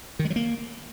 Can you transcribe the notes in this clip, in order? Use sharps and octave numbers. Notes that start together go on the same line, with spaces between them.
D#3
G#3
F#3
A#3